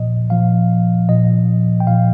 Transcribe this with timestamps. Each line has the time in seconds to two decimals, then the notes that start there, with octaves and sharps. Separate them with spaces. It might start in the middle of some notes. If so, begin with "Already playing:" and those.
Already playing: A#2 F3 D#5
0.30 A#2 F3 F5
1.09 A#2 F3 D#5
1.80 G5
1.87 A#2 F3 F5